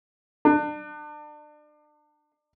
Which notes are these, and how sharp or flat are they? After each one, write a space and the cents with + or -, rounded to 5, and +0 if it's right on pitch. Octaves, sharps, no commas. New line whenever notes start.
D4 +35